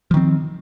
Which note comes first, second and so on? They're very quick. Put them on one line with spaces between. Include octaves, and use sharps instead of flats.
F3 D#3 C4